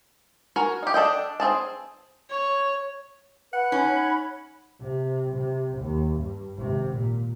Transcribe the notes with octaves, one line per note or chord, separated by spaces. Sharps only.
F#4 A#4 G#5
D#4 G4
D4 A4 D#5 G5
C4 F4 G#4 A5
C#5
B4 F#5
C#4 D#4 C#5 B5
C3
C3
D#2
G2
G#1 C3
A#2